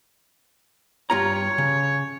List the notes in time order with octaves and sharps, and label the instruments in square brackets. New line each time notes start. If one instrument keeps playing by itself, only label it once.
[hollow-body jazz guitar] G2 F4 A#5 [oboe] C#5
[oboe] C#5
[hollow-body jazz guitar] C#3